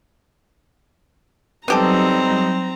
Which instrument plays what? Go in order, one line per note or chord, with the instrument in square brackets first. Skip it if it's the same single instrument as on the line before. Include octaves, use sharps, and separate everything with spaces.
[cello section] F#3 G3 D#4 [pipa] B3 G4 A4 [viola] C4 A#5